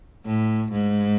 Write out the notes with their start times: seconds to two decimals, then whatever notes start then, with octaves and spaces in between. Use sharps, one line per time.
0.26 A2
0.72 G#2